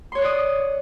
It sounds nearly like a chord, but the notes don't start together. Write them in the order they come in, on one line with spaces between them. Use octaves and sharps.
C6 C#5 F#6 D5 D#6